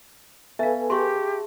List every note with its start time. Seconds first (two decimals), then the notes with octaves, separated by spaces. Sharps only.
0.59 B3 A4 B4 E5 F5 G#5
0.90 G4 G#4 E5 A5 C6 C#6